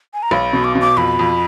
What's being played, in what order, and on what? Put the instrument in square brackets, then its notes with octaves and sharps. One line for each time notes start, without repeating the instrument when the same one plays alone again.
[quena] G#5
A#5
[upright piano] B1 [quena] B5
[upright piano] B2
[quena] D6
[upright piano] B2
[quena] D6
[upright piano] F2 [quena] B5
[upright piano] F2